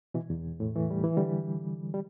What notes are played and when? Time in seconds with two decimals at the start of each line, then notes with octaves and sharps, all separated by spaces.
0.14 B2 E3
0.30 E2
0.60 A2
0.75 E3 A3
0.91 G3
1.04 E3
1.17 D3 G3
1.94 G3